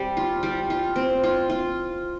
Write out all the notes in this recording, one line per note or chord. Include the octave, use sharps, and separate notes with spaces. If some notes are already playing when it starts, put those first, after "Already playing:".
Already playing: G3 C4
F4
G3
F4
C4
F4
F4